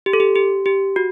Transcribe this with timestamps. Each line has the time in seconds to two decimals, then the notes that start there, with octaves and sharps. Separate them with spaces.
0.06 G4
0.13 A4
0.20 G4
0.35 G4
0.66 G4
0.96 F#4